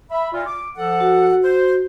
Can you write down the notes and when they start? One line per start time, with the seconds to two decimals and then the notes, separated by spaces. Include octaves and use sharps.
0.11 E5 B5
0.33 A#2 F4
0.47 D6
0.77 F3 A4 F#5
1.00 F#4
1.43 C5